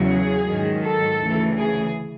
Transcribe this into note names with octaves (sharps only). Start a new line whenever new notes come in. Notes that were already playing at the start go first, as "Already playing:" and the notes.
Already playing: E2 C#3 F#3
G#4
G#2 D#3 F#3
A4
D2 C#3 E3
G#4